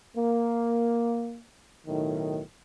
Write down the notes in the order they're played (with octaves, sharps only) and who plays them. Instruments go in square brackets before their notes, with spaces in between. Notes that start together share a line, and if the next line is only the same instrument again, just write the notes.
[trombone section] A#3
B1 A2 D#3